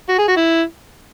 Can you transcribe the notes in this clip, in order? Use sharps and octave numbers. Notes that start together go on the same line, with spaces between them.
F#4
G#4
F#4
E4